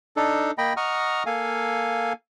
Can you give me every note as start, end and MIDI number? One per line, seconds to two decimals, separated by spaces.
0.16 0.51 62
0.16 0.51 63
0.16 0.51 69
0.58 0.73 58
0.58 0.73 75
0.58 0.73 79
0.58 0.73 83
0.77 1.23 75
0.77 1.23 78
0.77 1.23 82
0.77 1.23 85
0.77 1.23 87
0.77 1.23 89
1.26 2.13 58
1.26 2.13 69
1.26 2.13 77
1.26 2.13 80